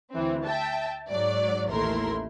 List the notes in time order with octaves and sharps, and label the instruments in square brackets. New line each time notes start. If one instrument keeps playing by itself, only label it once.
[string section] D2 E3 C4
E5 G5 A5
G#2 F#3 D5
A1 D#2 A3 E4 A#4 C6